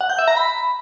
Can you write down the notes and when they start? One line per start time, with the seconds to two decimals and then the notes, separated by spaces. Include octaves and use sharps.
0.01 F#5
0.10 G6
0.19 E5
0.28 A#5
0.37 B5